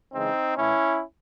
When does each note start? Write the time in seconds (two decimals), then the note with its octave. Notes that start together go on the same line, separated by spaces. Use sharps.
0.13 C#3 E3 G#3 C4 D#4
0.57 A2 E3 A3 C#4 E4